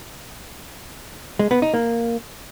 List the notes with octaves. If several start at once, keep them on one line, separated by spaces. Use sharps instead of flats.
G#3
B3
D#4
A#3